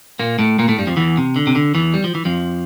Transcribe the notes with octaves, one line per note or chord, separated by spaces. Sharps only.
A#2 A#3
A2 A3
A#2 A#3
A2 A3
G2 G3
F2 F3
E2 E3
C3
D3
C3
D3
E2 E3
G3
F3
E3
F2 F3